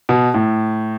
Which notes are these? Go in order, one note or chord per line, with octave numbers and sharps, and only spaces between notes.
B2
A2